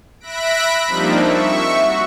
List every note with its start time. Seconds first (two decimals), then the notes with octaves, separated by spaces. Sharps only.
0.20 E5 B5 F#6 A#6 B6 D7
0.88 F3 G3 A#3 C4 D4 D#4
1.23 E5 C#6
1.75 F#4